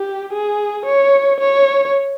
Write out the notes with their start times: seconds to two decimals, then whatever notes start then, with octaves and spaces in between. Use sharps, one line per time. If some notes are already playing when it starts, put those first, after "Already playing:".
Already playing: G4
0.33 G#4
0.85 C#5
1.40 C#5